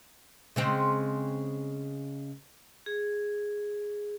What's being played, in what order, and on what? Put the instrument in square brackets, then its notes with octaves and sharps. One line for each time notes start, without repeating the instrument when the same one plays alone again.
[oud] C#3 G#3 C4
[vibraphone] G#4